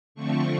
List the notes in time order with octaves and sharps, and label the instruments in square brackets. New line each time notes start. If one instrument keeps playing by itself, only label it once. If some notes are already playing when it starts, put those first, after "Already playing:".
[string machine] D3 F3 A3 C4 C#6